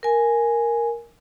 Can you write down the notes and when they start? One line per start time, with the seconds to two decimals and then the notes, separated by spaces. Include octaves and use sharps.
0.03 A#4 G#5